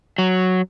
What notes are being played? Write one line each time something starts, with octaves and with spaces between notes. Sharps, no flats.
F#3